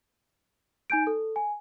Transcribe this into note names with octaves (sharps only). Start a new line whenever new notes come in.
D#4 G#5 G6 D7
A4
G#5